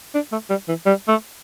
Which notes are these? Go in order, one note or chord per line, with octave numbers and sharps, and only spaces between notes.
D4
A3
G3
E3
G3
A3